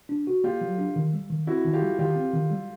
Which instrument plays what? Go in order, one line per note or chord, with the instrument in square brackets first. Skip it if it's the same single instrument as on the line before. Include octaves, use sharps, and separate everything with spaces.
[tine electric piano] D4
F#4
[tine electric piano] A#3 [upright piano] F4 G4
[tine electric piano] F#3
D4
D#3
G3
D#3
[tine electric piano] C4 [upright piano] E4 F#4
[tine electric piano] D#3
[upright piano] F4 G4
[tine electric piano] G3
[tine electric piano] D#3 [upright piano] F4 G4
[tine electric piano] C4
D#3
G3